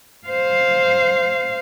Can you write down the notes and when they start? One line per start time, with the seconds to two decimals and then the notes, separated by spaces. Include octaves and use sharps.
0.28 C5 F5